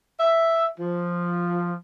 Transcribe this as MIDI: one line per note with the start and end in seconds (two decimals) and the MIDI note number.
0.20 0.67 76
0.79 1.75 53